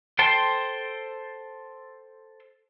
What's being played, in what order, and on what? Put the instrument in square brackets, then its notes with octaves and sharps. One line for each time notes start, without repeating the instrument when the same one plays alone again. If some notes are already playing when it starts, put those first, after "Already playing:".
[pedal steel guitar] A4 C5 G5 A5 C6